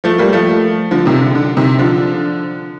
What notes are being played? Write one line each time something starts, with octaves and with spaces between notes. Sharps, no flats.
F3 A3
G3 A#3
F3 A3
D3 F3
C3 D#3
D3
D3
C3 D#3
D3 F3